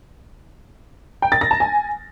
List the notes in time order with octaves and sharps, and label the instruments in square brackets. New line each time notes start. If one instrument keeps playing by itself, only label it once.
[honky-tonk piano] G5
A6
A#6
A5
G#5